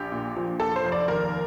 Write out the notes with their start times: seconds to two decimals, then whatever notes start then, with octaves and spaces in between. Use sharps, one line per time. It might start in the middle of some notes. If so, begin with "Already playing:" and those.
Already playing: A#1 G4
0.12 A#2
0.36 F3
0.60 F1 A4
0.76 C5
0.84 F1
0.92 D5
1.08 D#2 A#4